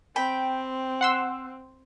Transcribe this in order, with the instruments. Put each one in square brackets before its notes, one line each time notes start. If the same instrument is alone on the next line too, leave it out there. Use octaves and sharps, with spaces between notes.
[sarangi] C4 [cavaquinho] G5 B5
[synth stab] F#5 C6 E6